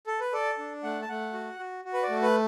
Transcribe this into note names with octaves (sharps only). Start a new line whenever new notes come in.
A4
B4
A4 D5
D4
A3 F#5
A5
A3 F#5
F#4
F#4
F#4
B4
D5
A3
B4